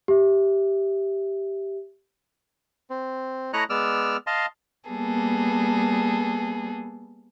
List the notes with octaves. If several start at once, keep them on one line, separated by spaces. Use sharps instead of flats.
G4 E5
C4
A3 E4 C#5 D#5 A#5 F#6
G#3 B3 D5 E6 F6
D#5 F5 A5 C6
G3 A#3 B3 G#4 A4